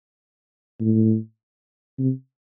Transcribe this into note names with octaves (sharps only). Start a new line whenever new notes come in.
A2
C3